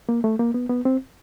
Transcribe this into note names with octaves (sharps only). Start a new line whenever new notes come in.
A#3
A3
A#3
B3
B3
C4